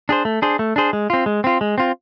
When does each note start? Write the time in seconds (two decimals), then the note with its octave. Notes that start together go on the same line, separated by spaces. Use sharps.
0.09 D4 G#4 C5
0.25 A3
0.42 D4 G#4 C5
0.59 A3
0.76 D4 G#4 C5
0.93 G#3
1.10 C4 F4
1.26 G#3
1.44 C4 F4
1.61 G#3
1.78 C4 F4